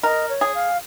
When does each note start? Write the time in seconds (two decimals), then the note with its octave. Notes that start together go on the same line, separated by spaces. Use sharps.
0.03 A#4 D#5
0.29 C#5
0.41 G#4
0.55 F5